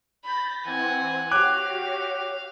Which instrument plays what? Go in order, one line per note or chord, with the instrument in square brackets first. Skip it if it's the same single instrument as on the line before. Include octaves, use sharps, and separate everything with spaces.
[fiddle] B5 [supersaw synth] G6 A6 A#6
[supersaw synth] E3 C4 [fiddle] F#5 G#5
[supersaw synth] F#4 G4 [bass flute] C#5 [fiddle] F5 [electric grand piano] D6 F#6